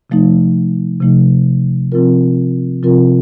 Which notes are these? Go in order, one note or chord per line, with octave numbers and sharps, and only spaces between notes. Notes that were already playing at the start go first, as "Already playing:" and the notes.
C3 F3 A3 D#4
C3 F3 A3 D#4
C3 F3 C4 F4 A#4
C3 F3 C4 F4 A#4